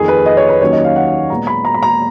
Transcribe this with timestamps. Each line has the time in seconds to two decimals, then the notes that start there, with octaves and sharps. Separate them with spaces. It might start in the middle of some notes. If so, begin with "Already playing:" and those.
Already playing: F2 D#3 A#3 G#4
0.08 B4
0.26 D#5
0.37 C#5
0.49 B4
0.61 D#2 D#3 F#3 C#4 C#5
0.72 D#5
0.84 F5
0.96 F#5
1.07 F#5
1.30 A#2 G#3 B3 A#5
1.47 B5
1.65 A#5
1.74 B5
1.83 A#5